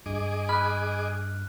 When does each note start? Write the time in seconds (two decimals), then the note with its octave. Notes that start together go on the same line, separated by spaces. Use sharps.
0.06 G2 G#4 D#5 D6
0.49 B5 F6 F#6